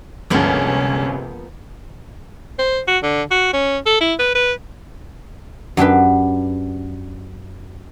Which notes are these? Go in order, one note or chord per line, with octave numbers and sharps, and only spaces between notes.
G1 C#2 C3 F3 A#3 B3 C#4 A5
C5
F#4
D3
F#4
C#4
A4
E4
B4
B4
F#2 D4 G4 B4